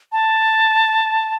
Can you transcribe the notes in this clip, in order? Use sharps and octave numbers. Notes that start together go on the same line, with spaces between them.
A5